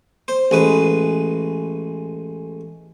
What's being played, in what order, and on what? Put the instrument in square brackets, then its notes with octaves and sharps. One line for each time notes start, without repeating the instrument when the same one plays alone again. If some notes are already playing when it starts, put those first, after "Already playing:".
[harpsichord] C5
A1 G#3 B4